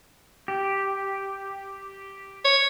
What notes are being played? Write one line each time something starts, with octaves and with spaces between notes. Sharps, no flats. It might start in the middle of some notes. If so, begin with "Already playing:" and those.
G4
C#5